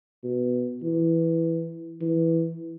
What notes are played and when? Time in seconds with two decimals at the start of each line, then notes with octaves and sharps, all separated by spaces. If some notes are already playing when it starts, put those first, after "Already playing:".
0.24 B2
0.83 E3
2.01 E3